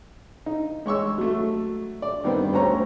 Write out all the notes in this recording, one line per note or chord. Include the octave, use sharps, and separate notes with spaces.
D#4
G#3 C#5 C#6 E6
F#3 A3
D5
G2 D#3 B3 C4
D2 C#4 C5 C#5 A#5